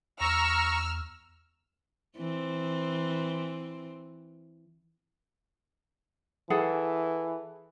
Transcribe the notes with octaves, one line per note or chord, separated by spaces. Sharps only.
E2 A#5 C#6 E6 F6
E3 C4
E3 G#4 A4 F#5